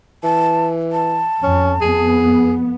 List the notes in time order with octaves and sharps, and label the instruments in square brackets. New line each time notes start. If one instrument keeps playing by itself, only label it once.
[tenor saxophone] E3 [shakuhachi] A5
[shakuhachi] A5
[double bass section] F2 [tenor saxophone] C#4
[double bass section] F2 B3 [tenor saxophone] G#4